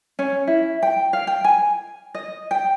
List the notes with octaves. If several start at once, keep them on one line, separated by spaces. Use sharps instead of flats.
C#4
E4
G5
F5
G5
G#5
D#5
G5